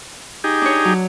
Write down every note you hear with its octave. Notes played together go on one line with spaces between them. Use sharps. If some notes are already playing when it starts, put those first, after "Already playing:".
D#4 G4 G#4
D4 C#5
F#3